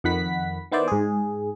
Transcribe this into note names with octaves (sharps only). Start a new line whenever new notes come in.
F2 D#3 F#5 B5 B6
D#3 B3 E4 C5 D5
G#2 G#4